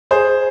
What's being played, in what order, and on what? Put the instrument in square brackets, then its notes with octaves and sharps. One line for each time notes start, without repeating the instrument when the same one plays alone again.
[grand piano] G#4 C5